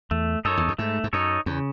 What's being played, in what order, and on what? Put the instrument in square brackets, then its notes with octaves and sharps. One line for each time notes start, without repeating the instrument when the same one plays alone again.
[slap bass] E2 [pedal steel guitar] A3
[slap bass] F#2 [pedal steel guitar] D#4 A4 C#5
[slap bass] E2
F#2
[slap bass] G#2 [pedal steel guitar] A3
[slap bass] G#2
[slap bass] F#2 [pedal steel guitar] D#4 A4 C#5
[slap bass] E2 [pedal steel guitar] C#3